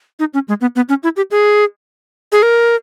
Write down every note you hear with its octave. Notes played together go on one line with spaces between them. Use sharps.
D#4
C#4
G#3
B3
B3
C#4
E4
G4
G#4
G#4
A#4